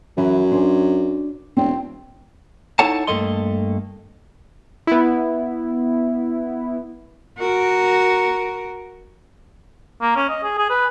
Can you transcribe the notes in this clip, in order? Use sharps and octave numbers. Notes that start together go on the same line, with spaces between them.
F#2 E3
D4 C5 G#5
E1 C4
D#4 E4 A4 C#5 F#5 A5
G2 A3 A#3 A4 D#5 C6
B3 E4
F#4 A#4
A#3
C#4
D#5
G#4
G#4
B4